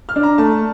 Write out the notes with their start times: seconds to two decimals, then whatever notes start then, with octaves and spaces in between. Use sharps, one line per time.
0.09 F6
0.16 D4
0.23 A#5
0.38 A3 A5